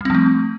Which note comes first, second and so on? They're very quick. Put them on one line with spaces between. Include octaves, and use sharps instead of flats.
G3 C4 F3 A3